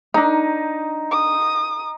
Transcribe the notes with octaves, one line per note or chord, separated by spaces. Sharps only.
D4 D#4 A#5
D#6